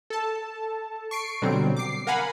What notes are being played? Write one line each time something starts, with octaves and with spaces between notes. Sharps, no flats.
A4 A5
C#6 C7 D7
B2 D3 F#3 G3 C4
D6 C7
A#4 F5 F#5 G#5 B5